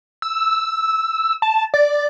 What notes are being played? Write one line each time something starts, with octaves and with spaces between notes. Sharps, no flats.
E6
A5
D5